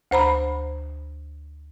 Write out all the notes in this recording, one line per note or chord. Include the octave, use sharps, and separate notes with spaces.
D2 C5 A#5 B5